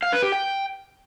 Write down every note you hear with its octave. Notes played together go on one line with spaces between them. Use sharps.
F5
B4
G4
G5